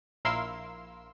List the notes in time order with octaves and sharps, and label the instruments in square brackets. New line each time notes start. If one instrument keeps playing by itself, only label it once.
[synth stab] A#1 E4 A#4 F5 C6 E6